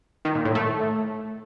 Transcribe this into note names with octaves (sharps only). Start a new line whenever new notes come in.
D#3
A#2
A2
A3